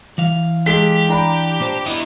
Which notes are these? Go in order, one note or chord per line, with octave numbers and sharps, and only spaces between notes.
E3 F5
G#3 G4 A4 B6
D4 A#5 B5
A#2 C5 A5
B3 E4 D#5